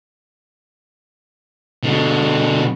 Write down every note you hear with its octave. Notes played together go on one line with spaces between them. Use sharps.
B2 D3